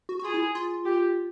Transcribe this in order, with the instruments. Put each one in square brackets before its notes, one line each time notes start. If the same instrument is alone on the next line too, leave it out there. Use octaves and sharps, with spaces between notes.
[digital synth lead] F#4
F#4
[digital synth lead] F4 [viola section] G#4
[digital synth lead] E4
F4
[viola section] G4